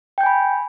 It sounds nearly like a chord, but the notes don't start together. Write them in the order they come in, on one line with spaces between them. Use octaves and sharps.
G5 G6 G#5 B5